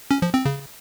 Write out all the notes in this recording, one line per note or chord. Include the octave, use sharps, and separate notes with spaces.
C#4
F3
C4
C#3